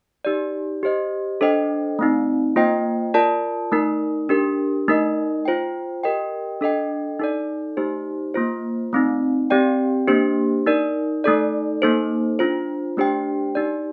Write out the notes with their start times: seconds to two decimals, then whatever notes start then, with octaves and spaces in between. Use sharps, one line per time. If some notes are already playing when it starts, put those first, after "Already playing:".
0.25 D#4 G4 D5
0.83 G4 C5 D#5
1.41 D4 A4 C5 D#5 G5
1.99 A3 C4 D#4
2.56 A#3 F4 C5 D#5 G5
3.14 F4 A#4 D5 A5
3.72 A3 D#4 A#4
4.29 D4 G4 A#4
4.88 A3 D#4 A#4 D#5
5.45 F4 C5 G5
6.04 G4 A#4 D#5 G5
6.61 D4 A4 D#5 G5
7.19 D#4 A4 D5
7.77 A3 D#4 G4 C5
8.34 A#3 F4 C5
8.93 A3 C4 D#4
9.50 C4 G4 D5 G5
10.08 A#3 D4 G4 C5
10.66 D#4 A#4 D5
11.24 A3 D#4 A4 D5
11.82 A#3 D#4 A4 C5
12.39 D4 F4 C5
12.97 A3 D4 G4 C5 G5
13.55 D#4 G4 D5